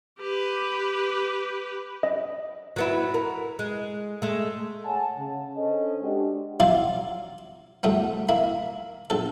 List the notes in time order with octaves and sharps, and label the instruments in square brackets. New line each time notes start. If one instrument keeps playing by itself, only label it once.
[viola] G4 B4
[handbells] D#5
[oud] F#3 B3 E4
A#4
G#3
G#3 A3
[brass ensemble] G#4 C#5 F#5 G#5 A5
C#3
C#4 D4 A4 C5 D#5
G#3 D4 F#4 G4
[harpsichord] F#3 E4 F4 D5 F5
C2 F#2 A3 B3
A#3 E4 B5
A#1 A4